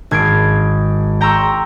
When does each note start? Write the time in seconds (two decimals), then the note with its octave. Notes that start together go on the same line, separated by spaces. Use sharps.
0.11 G#1 G#6 C7 D7
1.21 G5 A#5 C6 C#6 E6